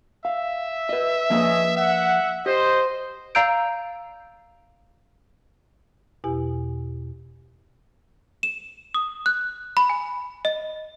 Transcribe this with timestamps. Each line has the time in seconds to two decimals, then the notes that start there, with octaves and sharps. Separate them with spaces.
0.25 E5 F5
0.89 B4 D#5
1.30 F3 A#3 C#4 G#4 B4 D#5
1.77 E5 F#5
2.46 G4 C5 D#5
3.35 D5 F5 A#5 E6 G6 D7
6.24 E2 B2 E4 G4 G#5
8.43 E7
8.94 D#6
9.26 F#6
9.77 B5
9.89 G#5
10.45 D#5